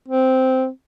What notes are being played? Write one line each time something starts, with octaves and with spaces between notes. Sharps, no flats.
C4